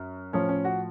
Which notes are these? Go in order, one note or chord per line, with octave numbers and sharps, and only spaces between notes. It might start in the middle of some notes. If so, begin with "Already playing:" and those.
Already playing: F#2
A2 F3 C#4
C#4
F#4